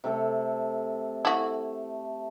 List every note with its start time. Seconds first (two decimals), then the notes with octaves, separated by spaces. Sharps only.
0.04 C3 A3 A4
1.25 A3 E4 F#4